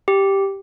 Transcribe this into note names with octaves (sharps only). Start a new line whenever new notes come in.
G4